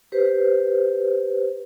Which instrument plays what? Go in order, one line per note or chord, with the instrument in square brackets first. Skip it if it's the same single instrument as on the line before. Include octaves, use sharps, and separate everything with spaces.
[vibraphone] G4 B4 C5